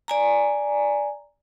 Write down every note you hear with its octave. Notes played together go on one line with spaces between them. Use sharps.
D5 G#5 A#5